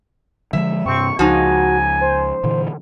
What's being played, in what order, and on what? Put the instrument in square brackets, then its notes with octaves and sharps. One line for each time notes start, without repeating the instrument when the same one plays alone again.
[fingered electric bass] D3 F3 G#3 [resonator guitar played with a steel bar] E5
[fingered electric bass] G2 C3 [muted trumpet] C4 [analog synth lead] C#6
[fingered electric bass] C#2 [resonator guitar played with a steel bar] F3 A#3 D#4 [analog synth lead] F#4 [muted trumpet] G#5
[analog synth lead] C5
[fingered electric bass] A#2 D3 E3